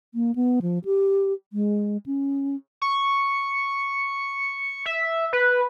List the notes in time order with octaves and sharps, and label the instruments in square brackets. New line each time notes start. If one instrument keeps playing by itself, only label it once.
[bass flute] A#3
B3
F3
G4
G#3
C#4
[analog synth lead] C#6
E5
B4